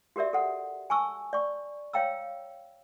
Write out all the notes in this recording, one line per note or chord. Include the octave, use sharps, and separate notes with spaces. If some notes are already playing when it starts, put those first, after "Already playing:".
F#4 G4 A#4 D5 E5
A4 F#5
G#5 A5 C#6 E6
D5 C#6
C#5 F5 G5 A#5 E6